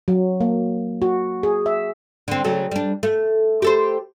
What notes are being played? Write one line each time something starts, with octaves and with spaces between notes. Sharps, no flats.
F#3
A#3
F#4
G#4
E5
D3 C4
C#3 F#3 A3
G3 D4
A3
G4 A4 C5